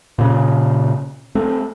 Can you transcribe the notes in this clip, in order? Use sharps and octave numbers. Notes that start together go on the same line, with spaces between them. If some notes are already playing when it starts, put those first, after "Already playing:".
A#2 C#3
A3 C4